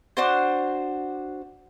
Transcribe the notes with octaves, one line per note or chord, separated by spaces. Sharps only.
D4 F#4 C5